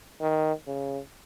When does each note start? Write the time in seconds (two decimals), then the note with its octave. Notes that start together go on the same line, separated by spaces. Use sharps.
0.21 D#3
0.67 C#3